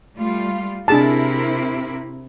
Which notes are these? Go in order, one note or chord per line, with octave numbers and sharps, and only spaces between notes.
G3 A3 F4
C3 D4 E4 G#4 A#4 A5